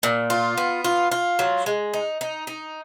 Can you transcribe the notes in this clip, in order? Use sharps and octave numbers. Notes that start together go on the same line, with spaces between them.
A#2
F4
B3
F4
F4
F#3
G#3
D#4
D#4
D#4